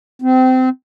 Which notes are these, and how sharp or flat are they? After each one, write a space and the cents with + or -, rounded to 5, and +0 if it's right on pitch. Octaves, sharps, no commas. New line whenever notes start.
C4 -25